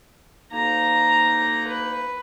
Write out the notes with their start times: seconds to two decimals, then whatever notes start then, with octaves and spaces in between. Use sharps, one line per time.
0.52 D2 A#3 D#4 A#5
1.67 B4